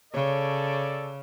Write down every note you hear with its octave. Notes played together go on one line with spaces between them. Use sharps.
C#3 A4 C#5 D5